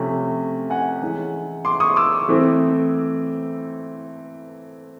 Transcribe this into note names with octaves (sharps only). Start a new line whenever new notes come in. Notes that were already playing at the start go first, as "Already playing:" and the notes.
Already playing: C3 F3 A3 C#4
F#5 G#5
E3 G#3 C#4
C6 D6
C#6 D#6
D6 E6
E3 A3 C4